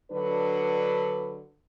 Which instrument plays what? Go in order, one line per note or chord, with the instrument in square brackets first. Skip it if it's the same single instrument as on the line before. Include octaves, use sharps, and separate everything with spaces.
[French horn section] D3 F#3 D4 B4